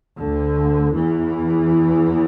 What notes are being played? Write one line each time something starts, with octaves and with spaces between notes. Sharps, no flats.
D2 D3
E2 E3